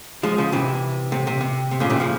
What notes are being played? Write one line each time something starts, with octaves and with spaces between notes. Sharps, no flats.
F3 G#3
C#3 F3
C3 E3
C3
C3
C3
C3
A#2 C#3
C3 E3
C#3 F3